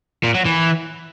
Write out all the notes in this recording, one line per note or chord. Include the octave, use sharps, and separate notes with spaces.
A#2
F#3
E3